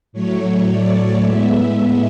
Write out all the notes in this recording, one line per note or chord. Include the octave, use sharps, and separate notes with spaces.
A2 F#3 A3 C#5
D5
A2 G#3 B3 E5
E5